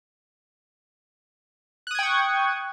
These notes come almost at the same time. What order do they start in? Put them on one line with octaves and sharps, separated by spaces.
F#6 D#6 G#6 G5 C#6